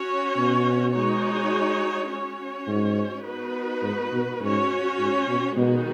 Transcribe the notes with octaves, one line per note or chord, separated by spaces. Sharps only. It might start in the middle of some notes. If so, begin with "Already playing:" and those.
Already playing: C#4 F#4 C#5
B2
G#3 D#4 F#4 C#5
C#4 F#4 C#5
G#2
B3 D#4 F#4 B4
G#2
B2
G#2 C#4 F#4 C#5
G#2
B2
B2 D#3 G#3 B3 D#4 F#4